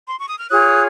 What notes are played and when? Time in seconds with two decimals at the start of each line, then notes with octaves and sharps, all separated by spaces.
0.07 C6
0.18 C#6
0.28 D#6
0.39 F6
0.50 F4 G#4 C#5 D#6 F#6